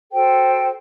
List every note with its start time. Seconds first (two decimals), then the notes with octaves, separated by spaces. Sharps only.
0.12 F#4 A4 C5 G5